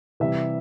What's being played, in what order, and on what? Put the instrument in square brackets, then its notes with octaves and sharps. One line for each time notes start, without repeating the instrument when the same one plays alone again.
[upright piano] C3 E3 G3 E5